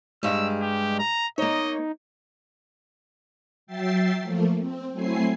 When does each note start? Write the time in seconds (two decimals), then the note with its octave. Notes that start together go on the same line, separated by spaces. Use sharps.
0.23 G2 G3 G#3 E6
0.61 G4
0.99 A#5
1.38 A#3 D#4 C#5 D#5
3.67 F#3 E5 G5 A6 C7
4.20 F3 A3 A#3
4.58 C4
4.92 F#3 A3 C4 E4 G#5 C7